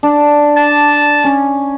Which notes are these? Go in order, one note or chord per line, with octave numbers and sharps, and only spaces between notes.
D4
A5
C#4